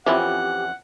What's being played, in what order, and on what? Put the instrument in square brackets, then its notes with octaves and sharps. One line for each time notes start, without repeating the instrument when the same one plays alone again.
[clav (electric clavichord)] F2 E3 C#4 [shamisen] F3 C4 E4 [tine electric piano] G4 [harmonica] F#5